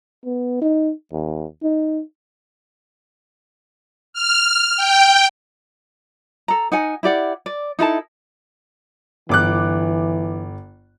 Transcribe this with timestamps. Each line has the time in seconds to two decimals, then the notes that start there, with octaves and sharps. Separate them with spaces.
0.25 B3
0.61 D#4
1.12 D#2
1.63 D#4
4.13 F6
4.77 G5
6.48 A4 A#5
6.72 D#4 F#5 G#5
7.03 E4 G4 D5 F#5
7.46 D5
7.79 D#4 E4 A4 A5
9.29 G1 E3 D6 F#6